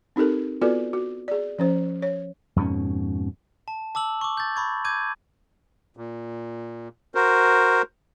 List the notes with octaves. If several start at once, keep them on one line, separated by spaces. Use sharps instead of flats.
C4 D#4 G4 A4 A#4
B3 F4 F#4 A4 B4 D5
F#4
G#4 D5
F3 C#4 C5
C#5
F2 G#2 B2 C#4
A5
A5 D6 E6 F#7
C#6 D6
G6 A6
B5 C#6 G#6
D6 G6 G#6 D#7
A#2
F#4 A#4 C5